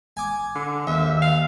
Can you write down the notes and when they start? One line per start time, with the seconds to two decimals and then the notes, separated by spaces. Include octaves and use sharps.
0.17 G#5 D6
0.55 D3
0.87 D#2 E5
1.22 F5